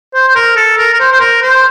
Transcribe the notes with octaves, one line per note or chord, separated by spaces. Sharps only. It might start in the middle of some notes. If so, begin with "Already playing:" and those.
C5
C5
A#4
A4
A#4
A#4
C5
C5
A#4
C5